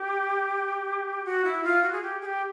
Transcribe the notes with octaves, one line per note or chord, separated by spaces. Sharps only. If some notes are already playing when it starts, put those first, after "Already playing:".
Already playing: G4
F#4
E4
F4
F#4
G#4
G4
G#4
G4